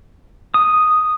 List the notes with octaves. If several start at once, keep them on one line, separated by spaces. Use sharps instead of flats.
D#6